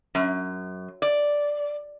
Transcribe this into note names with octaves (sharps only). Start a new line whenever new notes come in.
F#2
D5